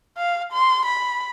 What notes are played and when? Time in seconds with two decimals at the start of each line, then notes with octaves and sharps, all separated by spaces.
0.18 F5
0.53 C6
0.86 B5